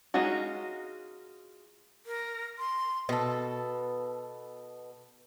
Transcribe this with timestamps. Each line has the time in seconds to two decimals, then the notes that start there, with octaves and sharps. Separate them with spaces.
0.14 G#3 C#4 D#4 F4 F#4
2.06 A#4
2.59 C6
3.09 B2 A4